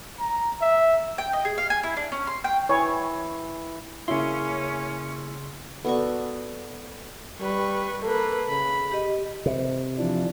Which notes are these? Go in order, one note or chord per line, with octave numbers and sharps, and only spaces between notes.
A#5
E5
G5
D#5
G#4
F5
G#5
E4
D4
C#4
C6
G5
E3 C#5
C#3 A#3 C#4 E4 C6
B3 F#4 A4 D5 C#6
G3 B4 C#6
A#3 A4 B4
C#3 B5
G4 D#5
C3
E3 F3 D4